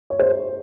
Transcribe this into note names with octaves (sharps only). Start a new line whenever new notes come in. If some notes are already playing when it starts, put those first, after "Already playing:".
C#5
C5